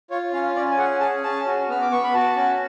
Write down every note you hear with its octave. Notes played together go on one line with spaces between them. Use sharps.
F4 C#5
C#4 F5
C#4 D5
G#5
G#4 F#5
G#4 A5
C#4 A5
F#4
B3 F6
D6
B3 C#6
B5
F#4 A5
C#4